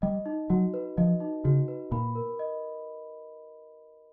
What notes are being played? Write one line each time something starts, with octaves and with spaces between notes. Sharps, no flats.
G3 D#5
D#4
F#3 F#4
B4
F3 D#5
D#4
C#3 F#4
B4
A#2 B5
A#4
D#5